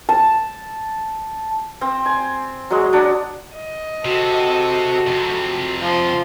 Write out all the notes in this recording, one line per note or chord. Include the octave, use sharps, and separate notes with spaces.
A5
C4
G#5
F#3 G#3
F#3 D4
D#5
C3 F#4 A4
F2 C3
F3 C6